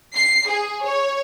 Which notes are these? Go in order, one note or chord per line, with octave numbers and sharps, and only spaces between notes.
C7
G#4
C#5